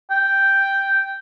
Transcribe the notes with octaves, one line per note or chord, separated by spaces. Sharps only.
G5